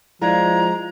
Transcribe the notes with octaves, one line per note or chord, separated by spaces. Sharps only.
F3 G#3 E4 D5 F5 A#5